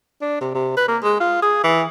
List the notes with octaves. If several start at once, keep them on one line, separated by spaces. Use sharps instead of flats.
D4
C3
C3
B4
A#3
G#3
F4
G#4
E3